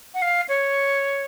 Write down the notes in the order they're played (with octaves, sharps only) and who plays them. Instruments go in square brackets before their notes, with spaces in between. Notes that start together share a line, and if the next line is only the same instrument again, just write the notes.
[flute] F#5
F5
C#5